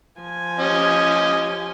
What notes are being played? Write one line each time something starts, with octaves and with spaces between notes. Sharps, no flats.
F3 G#5
C#4 G4 D#5